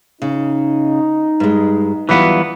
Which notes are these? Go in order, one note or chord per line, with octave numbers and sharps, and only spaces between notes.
C#3 D#4
G2 G#3
E3 F#3 G3 B3 F4